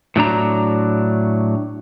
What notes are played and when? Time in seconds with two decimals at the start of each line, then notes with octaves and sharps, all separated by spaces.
0.16 A2 F#3 D4 A#5